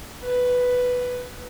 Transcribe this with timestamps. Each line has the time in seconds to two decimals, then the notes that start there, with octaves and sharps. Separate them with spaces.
0.23 B4